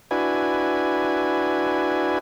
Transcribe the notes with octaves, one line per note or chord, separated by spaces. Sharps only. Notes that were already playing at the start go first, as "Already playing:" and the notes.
D4 E4 F#4 B4 G#5